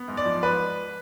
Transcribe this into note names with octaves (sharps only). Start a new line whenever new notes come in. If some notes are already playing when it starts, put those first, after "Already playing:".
Already playing: B3
G#2
D5
F3
B4